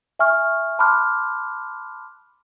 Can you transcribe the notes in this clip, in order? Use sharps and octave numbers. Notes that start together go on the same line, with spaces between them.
E5 G#5 C#6 F6
A5 B5 C6 D6 F6 F#6